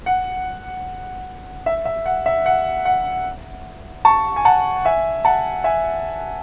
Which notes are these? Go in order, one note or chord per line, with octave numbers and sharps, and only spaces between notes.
F#5
E5
E5
F#5
E5
F#5
F#5
A5 C#6
G#5
F#5 A5
E5 G#5
F#5 A5
E5 G#5